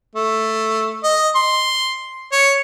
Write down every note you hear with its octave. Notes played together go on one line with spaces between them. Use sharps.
A3
D#5
C6
C#5